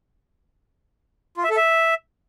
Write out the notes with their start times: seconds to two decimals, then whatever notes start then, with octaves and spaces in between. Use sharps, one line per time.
1.37 F4
1.44 E5
1.50 A4
1.56 E5